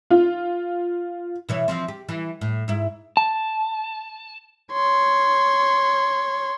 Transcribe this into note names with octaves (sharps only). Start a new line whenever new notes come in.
F4
B2 E3 C#5
E3 F3 C4
G4
E3
A2
G#2 E4
A5
C#5 C6